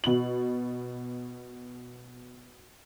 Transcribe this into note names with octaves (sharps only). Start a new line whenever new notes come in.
B2 F#7